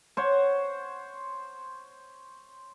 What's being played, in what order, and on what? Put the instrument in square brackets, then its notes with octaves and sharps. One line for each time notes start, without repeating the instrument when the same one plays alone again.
[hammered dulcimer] C5 C#5 F#5